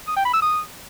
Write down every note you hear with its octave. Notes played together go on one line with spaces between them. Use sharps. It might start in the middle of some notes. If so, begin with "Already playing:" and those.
D#6
G5
B5
E6
D#6